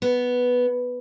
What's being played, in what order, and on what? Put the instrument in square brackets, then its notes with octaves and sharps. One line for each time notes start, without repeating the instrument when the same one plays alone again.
[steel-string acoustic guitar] B3